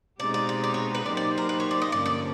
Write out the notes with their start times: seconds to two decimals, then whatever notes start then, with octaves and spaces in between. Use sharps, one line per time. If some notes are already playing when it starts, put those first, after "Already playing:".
0.20 B2 G#3 C4 D#4 G4 D5
0.34 D5
0.49 D5
0.64 D5
0.74 C#5
0.95 B4
1.06 F#3 A#3 D#4 G4 C5 D5
1.17 D5
1.38 A#4
1.49 B4
1.60 C#5
1.71 D5
1.82 D#5
1.92 G2 D3 F3 A#3 C#4 D5
2.06 D5